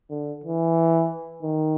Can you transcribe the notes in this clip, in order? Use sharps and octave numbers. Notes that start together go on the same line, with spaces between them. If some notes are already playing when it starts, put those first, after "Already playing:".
D3
E3
D#3